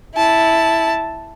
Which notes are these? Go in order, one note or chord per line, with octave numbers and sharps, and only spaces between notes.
E4 A5